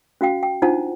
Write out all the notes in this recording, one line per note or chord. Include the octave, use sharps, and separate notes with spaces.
C#4 F#4 F5 G5
G5
D4 D#4 F4 C5 F#5 A5